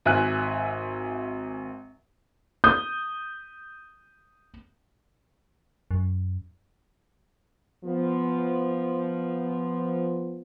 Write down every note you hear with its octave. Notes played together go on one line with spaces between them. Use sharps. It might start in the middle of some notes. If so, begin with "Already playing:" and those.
G#1 E5 G#5 F#6
D#6 G6
F#2
F3 B3